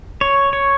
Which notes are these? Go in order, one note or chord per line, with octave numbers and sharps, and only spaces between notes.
C#5
C#5